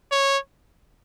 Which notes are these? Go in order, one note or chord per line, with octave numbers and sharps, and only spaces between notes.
C#5